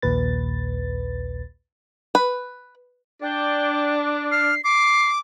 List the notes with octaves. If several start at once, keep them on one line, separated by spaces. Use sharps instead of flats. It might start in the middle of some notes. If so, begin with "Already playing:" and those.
A#1 D#2 A#2 B4 A6
B4
D4 G5
F6 C7
D6 C7